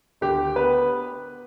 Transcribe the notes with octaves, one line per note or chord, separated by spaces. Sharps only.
D2 G4
B3 B4